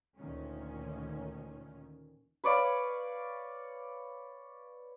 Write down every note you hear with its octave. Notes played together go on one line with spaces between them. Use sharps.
D2 A#2 D#3 C#4
B4 C#5 D5 F5